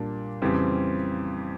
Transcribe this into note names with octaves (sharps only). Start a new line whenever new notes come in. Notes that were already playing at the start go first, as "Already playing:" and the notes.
Already playing: A#2 G3 A#3 D4
F2 C#3 E3 G3 C4